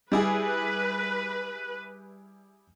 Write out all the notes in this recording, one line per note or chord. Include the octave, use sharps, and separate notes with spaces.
G3 E4 G#4 B4